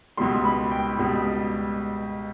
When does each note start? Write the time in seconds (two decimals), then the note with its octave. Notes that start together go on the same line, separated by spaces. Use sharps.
0.17 C#2 B2 G3 C6
0.44 B5
0.71 G5
0.99 C#2 B2 G3